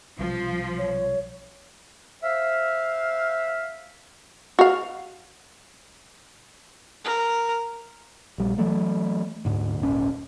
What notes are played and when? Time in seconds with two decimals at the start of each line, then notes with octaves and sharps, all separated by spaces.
0.19 B1 C3 F3 G3
0.78 C#5
2.22 C5 E5 F5
4.59 F#4 F5
7.05 A#4
8.38 A#1 G3
8.58 E3 F#3 A3
9.45 D2 G#2
9.80 D#1 G#1 C#4